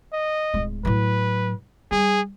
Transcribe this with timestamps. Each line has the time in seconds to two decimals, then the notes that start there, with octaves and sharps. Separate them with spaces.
0.13 D#5
0.54 D1 G#3
0.85 A2 F#3 B4
1.91 G3 G#4